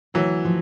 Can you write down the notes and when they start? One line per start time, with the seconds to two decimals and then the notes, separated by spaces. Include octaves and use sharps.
0.14 D2 E3 F#3
0.45 F3